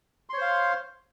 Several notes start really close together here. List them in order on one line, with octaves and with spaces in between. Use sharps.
C6 C#5 C5 F5